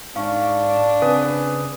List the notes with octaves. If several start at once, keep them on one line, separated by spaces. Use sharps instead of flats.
G#2 D4 F5 C#6
C#3 C4 B4 G#5 D#6